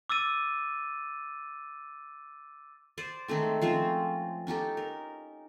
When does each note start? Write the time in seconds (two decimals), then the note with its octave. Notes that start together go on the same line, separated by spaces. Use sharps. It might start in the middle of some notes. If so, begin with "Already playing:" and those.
0.10 D6 E6 A6 D#7
2.98 C5 D5
3.28 D#3 G#3 A3 C4
3.62 F3 C4 C#4
4.47 C#4 D#4 G4 A4
4.77 A#4